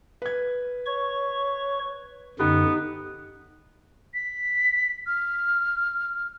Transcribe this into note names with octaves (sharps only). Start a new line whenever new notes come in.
B4 G#6
C#5 C#6
F#2 D3 B3 D#4 G4
B6
F6